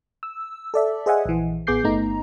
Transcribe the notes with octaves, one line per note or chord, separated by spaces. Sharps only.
E6
A4 D5 E5
G#4 C5 D#5 E5 F#5 G#5
A#1 E3
A1 B3 G#4 D6 G6 C7
G1 A3 B3 D#4 A#5